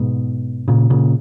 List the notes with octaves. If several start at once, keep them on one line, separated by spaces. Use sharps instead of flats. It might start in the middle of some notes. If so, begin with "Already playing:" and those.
Already playing: G#2 B2
A#2 C#3
A#2 C#3